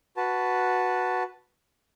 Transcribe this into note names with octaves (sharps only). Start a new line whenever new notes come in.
F#4 B4 A5